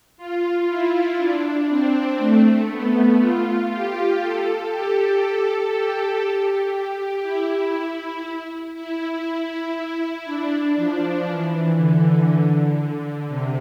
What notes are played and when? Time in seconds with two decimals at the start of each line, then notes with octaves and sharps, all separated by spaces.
0.17 F4
0.68 E4
1.18 D4
1.68 C4
2.18 A3
2.70 B3
3.20 F4
3.70 G4
4.21 A4
4.71 G4
5.22 A4
5.72 G4
6.22 G4
7.23 E4
8.74 E4
10.25 D4
10.76 F3
11.26 E3
11.77 D3
13.28 C3